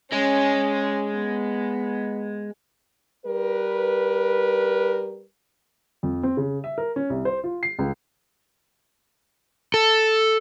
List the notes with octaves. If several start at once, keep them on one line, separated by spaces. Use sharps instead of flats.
G#3 C#4
B3
G3 A#4 B4
F2
C4
C#3
E5
A#4
C#4
C2
C5
F4
C7
C#2
A4